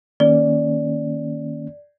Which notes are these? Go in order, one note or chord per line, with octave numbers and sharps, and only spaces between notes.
D#3 A#3 C#4 D5